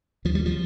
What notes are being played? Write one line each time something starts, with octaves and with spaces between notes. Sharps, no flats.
D#2 F3
G3
F3